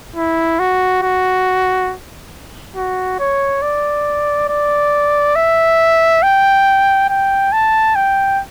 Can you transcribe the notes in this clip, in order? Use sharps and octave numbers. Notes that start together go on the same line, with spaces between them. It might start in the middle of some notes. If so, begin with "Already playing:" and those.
E4
F#4
F#4
F#4
C#5
D5
D5
E5
G5
G5
A5
G5